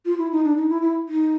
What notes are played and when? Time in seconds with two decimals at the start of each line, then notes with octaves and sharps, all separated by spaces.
0.06 F4
0.18 E4
0.32 D#4
0.44 D4
0.57 D#4
0.70 E4
0.82 E4
1.08 D#4